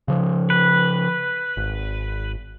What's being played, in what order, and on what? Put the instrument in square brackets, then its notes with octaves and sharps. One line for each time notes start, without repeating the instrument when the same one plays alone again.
[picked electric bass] C#3 F3
[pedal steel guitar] B4
[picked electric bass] G#1